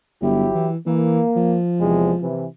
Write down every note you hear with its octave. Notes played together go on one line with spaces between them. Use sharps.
G1 F#3 E4 G4
E3
E3 A#3
F3
E2 C3 G#3
C3 E3